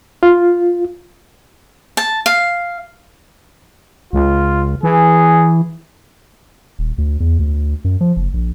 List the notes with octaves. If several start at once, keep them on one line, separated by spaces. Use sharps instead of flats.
F4
A5
F5
C#2 F4
E3 G#4
D#1
D2
E2
D2
F#2
F3
F#1
A#1